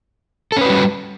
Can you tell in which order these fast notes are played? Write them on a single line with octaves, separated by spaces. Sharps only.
A4 C#4 B4 F#4 G3